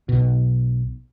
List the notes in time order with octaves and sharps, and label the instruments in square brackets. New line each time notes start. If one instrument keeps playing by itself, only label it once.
[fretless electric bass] B1 B2